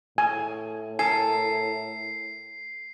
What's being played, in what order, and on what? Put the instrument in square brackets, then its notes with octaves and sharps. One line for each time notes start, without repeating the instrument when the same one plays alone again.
[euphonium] A2 [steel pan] G#5
[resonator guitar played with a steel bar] A4 A#4 [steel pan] G#5 [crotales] C7